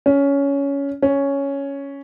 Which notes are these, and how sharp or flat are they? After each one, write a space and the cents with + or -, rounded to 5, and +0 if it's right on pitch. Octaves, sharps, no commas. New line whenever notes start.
C#4 +15
C#4 +5